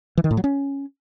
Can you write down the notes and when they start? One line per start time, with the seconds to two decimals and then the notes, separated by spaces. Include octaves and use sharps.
0.17 E3
0.24 D#3
0.31 A2
0.37 F#3
0.44 C#4